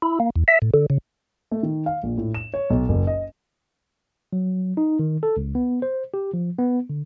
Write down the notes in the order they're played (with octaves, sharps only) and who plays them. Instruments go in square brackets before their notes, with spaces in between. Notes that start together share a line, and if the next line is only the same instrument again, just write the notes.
[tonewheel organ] E4
A#3
E2
E5
A2
D3
C#3
[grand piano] A3
D#3
F5
A#1
A2
E7
C#5
B1
F#1
D#5
[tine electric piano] F#3
D#4
D#3
A4
C#2
B3
C5
G4
F3
B3
D3